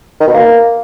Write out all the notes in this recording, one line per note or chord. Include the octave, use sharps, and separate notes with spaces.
D#3
B2
A#3